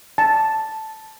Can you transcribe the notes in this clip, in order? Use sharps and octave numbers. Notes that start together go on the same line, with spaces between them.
A5